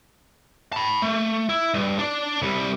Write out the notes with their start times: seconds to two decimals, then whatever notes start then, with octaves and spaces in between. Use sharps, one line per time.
0.73 A5 B5
1.02 A3
1.49 E4
1.74 G2
1.99 D4 D5
2.42 C2 G3